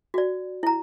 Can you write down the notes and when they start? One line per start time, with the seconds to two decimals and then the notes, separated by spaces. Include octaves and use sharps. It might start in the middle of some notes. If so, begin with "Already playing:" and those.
0.14 F#4 D5
0.63 E4 A#5